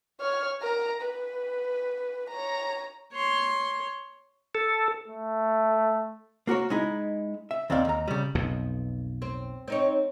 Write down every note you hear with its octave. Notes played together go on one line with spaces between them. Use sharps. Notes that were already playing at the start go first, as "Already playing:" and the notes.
C#5 F6
A#4 A#5
B4
C#5 A#5
C#5 C6
A4
A3
A#3 F#4 A#4 C#5
G#3 D#4 E4
E5
D#2 C4 D5 F5
D#2 A#5
C#3 G3
B1 F2 B2
C4
C4 D#4 C#5